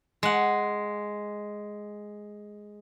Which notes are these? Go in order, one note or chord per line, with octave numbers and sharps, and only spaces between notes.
G#3 F#5